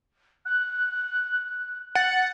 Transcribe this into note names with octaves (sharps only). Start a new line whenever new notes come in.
F#6
F#5 A6